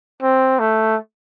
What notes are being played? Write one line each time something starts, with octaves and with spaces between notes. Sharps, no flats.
C4
A3